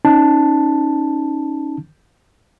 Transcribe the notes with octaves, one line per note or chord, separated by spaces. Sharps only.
C#4 D#4 A5